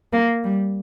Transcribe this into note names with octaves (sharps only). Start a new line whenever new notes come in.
A#3
G3